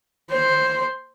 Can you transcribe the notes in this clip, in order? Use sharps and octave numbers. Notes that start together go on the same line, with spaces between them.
C5